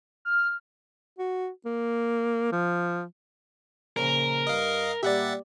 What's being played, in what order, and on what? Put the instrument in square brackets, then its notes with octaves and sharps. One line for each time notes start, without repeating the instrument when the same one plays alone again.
[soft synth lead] F6
[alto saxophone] F#4
A#3
F3
[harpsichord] A#2 C#3 F3 [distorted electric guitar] A#4
[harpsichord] G2 [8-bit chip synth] D#5 F5
[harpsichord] A#2 G3 [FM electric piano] G4 D5 [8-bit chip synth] E5 F#5 A6